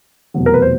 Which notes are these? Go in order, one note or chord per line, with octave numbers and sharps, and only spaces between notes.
F1 E2 B2 F#3
A#4
B4
C5